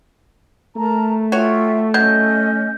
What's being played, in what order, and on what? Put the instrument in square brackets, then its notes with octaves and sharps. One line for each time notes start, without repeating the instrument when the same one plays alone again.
[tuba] A3 [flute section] A#4 A5 A#5
[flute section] F4 E5 G5 [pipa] F#4 C#5
[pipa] F#3 [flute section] C#4 D#5 [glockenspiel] G6